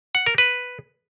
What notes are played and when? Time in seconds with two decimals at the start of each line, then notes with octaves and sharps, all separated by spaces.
0.15 F#5
0.26 A#4
0.38 B4